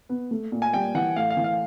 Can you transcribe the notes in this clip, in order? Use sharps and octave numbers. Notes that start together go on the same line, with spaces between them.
B3
A3
A#2
G#5
G3 G5
E3 F#5
A2 F5
F5
E3
F5